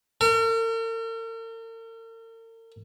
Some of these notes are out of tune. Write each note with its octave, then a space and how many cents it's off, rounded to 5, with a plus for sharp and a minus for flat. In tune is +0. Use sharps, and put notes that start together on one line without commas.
A#4 -45